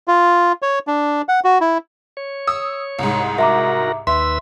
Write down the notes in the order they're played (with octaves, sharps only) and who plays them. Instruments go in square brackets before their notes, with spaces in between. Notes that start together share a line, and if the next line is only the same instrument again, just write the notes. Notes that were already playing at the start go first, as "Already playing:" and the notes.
[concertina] F4
C#5
D4
F#5
F#4
E4
[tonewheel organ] C#5
[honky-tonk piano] D#6 E6
C2 G#2
[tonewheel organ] F#4 A#4 [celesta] E5 A#5 D6
[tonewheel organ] D#2 B4 E6 [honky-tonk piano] E5 [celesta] C6